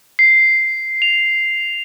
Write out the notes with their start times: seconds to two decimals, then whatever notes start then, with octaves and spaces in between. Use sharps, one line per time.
0.19 C7
1.02 F7